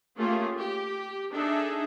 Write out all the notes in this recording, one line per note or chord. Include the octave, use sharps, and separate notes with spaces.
A3 A#3 C#4 F4 G4 G#4
G4
D4 D#4 G#4 A4 E5